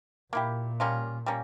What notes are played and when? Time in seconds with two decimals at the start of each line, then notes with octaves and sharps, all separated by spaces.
0.33 A#2 A#3 E4 G4
0.80 G3 A#3 C#4 F4
1.26 G3 A#3 C#4